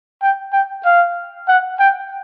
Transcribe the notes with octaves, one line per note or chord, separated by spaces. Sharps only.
G5
G5
F5
F#5
G5